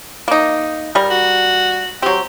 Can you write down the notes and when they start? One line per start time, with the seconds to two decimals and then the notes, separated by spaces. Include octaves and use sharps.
0.28 A#3 D#4
0.95 G3 A#4
1.11 F#4
2.02 F#3 C4 G4